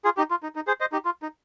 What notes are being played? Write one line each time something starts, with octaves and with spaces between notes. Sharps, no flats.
F4 G#4
D#4 G4
F4
D#4
D#4
G#4 C5
C5 D#5
D#4 G4
F4
D#4